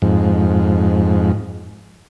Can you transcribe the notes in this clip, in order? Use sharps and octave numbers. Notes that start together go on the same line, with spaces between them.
F2 G#2